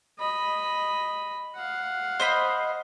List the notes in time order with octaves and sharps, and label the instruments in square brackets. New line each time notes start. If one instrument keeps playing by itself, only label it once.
[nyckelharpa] D#5 B5
F5 F#5
[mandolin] C5 D#5 B5